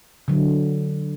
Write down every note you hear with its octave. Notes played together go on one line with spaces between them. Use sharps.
D3 F#3